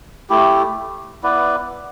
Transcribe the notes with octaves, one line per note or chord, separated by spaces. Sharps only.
A3 E4 G4
B3 E4 B4 D5